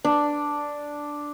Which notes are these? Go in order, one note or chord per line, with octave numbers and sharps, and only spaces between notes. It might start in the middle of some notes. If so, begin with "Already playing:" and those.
D4